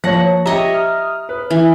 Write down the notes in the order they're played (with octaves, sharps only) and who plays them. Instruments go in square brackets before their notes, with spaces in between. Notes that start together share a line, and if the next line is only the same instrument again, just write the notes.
[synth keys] F3 A#3 C#5 [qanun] F#5 [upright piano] A5 A#6
[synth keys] G4 [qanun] C#5 D#5 E5 [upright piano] A#5
[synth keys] D#6 F6
[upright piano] B4
[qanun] E3